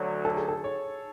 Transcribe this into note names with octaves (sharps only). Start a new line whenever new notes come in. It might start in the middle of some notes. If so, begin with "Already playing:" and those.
Already playing: D2 D3 F#3
A4
G#4
A4
C#5